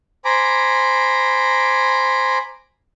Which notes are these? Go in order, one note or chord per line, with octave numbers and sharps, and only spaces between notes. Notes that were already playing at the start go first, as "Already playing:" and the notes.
C5 G#5 A#5 B5 D6